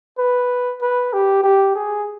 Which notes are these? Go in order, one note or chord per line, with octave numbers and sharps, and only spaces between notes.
B4
B4
G4
G4
G#4